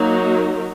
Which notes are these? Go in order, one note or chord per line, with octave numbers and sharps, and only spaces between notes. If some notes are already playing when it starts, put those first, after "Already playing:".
Already playing: F#3 A#3 D#4 F#4 A#4